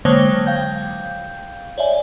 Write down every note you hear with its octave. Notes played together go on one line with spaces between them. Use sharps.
D3 F#3 G#3 A#3 C5 C#5
F5 G5 G6
C#5 D5 E5 G#5